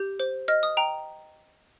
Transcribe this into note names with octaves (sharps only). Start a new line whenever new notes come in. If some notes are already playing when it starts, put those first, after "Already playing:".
Already playing: G4 G6
C5
D#5 F6
D#6
G5 A#5